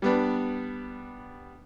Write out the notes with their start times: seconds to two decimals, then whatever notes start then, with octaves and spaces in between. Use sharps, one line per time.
0.02 G3 B3 D4